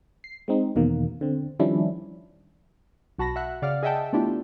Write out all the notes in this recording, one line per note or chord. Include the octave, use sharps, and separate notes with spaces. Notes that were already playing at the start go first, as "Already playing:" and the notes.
C7
G#3 C4 D#4
E2 B2 D#3 A#3
D3 C4
D#3 F3 G3 C#4 D4 E4
B1 F#4 A5 B5 A#6
E5 F#5 F#6
C#3 D5 F5 F#5 F6
G#4 D#5 E5 F#5 G5 A5
A3 B3 D4 E4 F4 G4